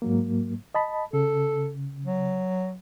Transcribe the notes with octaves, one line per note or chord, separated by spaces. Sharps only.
G#2 F#3 A#3
D#5 A5 B5
C#3 A4
F#3